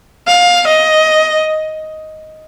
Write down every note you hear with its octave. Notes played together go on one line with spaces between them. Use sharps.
F5
D#5